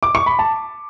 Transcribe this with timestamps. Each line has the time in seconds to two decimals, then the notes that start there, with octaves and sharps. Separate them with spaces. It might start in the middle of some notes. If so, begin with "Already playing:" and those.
0.03 D6
0.15 C#6
0.26 B5
0.39 A5